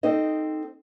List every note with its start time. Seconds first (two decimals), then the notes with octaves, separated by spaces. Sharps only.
0.03 C4 D#4 A4 D#5